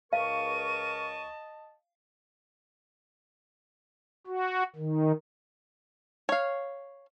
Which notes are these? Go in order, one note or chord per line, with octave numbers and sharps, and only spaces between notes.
C#2 A#4 D#5 F5 A5 C#6 D#7
F#4
D#3
C#5 F5